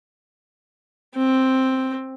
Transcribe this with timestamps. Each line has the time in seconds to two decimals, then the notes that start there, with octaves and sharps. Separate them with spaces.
1.15 C4